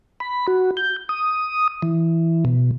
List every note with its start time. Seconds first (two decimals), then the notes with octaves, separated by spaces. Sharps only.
0.20 B5
0.48 F#4
0.77 G6
1.09 D#6
1.82 E3
2.45 B2